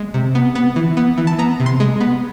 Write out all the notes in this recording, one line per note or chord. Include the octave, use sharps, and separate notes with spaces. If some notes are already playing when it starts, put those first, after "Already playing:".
Already playing: G#3
C3
B3
B3
E3
B3
E3
A5
B3 A#5
C3
C6
G#3
B3